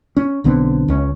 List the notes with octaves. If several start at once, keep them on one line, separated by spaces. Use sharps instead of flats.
C#4
B1 D3 B3 C4
C#2 C#4